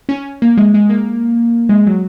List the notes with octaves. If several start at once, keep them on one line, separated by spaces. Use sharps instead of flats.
C#4
A#3
G#3
G#3
A#3
G#3
F#3